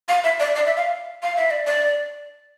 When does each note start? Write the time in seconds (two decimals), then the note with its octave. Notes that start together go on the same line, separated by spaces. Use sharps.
0.09 F5
0.24 E5
0.40 D5
0.55 D5
0.66 E5
0.77 F5
1.23 F5
1.36 E5
1.51 D5
1.67 D5